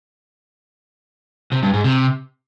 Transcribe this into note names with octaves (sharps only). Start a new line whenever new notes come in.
C3
G2
G#2
C3